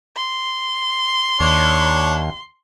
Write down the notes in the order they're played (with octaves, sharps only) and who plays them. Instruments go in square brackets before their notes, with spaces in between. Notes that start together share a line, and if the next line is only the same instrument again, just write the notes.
[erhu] C6
[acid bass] D#2 [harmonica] D4 C#5